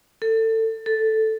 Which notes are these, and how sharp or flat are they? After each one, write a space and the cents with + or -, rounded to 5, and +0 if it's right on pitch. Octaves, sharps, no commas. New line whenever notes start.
A4 +25
A4 +0